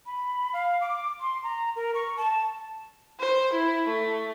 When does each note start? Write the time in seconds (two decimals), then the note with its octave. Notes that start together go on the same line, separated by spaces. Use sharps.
0.06 B5
0.53 F5
0.81 D6
1.20 C6
1.43 A#5
1.76 A#4
1.95 C#6
2.17 A5
3.20 C5
3.53 E4
3.88 A3